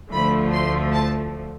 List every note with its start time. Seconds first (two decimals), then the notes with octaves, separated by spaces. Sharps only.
0.12 D2 D3 F3 A3 B5
0.53 C6
0.93 A5